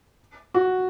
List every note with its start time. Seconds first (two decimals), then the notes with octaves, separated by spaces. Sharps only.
0.54 F#4